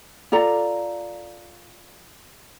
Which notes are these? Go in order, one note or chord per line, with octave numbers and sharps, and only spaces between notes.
F4 A4 D5 A#5